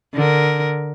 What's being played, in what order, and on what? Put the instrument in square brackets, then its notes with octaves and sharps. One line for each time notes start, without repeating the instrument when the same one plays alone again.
[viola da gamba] D3 A#4